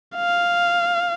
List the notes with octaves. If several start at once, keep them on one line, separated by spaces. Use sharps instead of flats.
F5